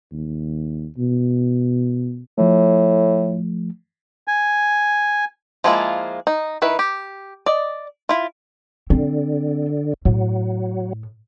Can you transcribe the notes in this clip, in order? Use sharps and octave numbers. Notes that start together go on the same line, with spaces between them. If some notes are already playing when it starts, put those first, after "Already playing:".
D#2
B2
A2 F3 A3
G#5
F3 G#3 A#3 E4 F4
D#4
D#3 E4 B4
G4
D5 D#5
E4 F4
D3 C4
A2 F#3